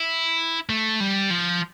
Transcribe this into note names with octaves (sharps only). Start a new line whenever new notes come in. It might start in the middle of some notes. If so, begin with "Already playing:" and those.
Already playing: E4
A3
G3
F3